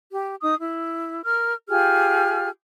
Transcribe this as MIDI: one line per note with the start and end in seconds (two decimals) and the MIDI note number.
0.12 0.37 67
0.42 0.54 63
0.42 0.54 87
0.59 1.22 64
1.25 1.54 70
1.25 1.54 89
1.69 2.48 65
1.69 2.48 67
1.69 2.48 68
1.69 2.48 89